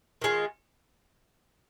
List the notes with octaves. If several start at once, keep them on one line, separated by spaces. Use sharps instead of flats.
D#3 G#3 F4